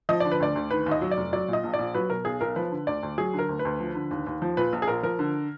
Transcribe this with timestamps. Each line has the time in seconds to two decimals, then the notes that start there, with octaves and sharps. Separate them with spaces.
0.09 F3 D#5
0.20 D3 D5
0.32 B4
0.40 D2 D5
0.56 D2
0.71 D#3 B4
0.86 D#2
0.91 D#5
1.01 F#3
1.11 D5
1.17 F1
1.33 F#3 D5
1.48 A#2
1.53 D#5
1.64 A#1
1.74 D5
1.79 A#1
1.95 F#3 B4
2.10 B2 A#4
2.25 B1 G#4
2.41 B1 A#4
2.56 F3 B4
2.72 D3
2.87 D2 D5
3.03 D2
3.18 F#3 G#4
3.33 D3
3.39 A#4
3.49 D2
3.59 B4
3.65 D2
3.80 F3
3.95 D3
4.11 D#2
4.27 D#2
4.42 F3
4.57 A#2 B4
4.73 A#1
4.82 G#4
4.88 A#1 A#4
5.03 F3 A#4
5.19 D3